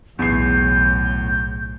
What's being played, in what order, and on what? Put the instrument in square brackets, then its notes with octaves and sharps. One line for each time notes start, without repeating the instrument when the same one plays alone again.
[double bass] B1 A2 [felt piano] E2 C7 [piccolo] G6